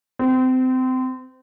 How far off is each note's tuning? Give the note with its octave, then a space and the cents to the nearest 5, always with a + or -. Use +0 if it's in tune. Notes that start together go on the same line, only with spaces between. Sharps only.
C4 -25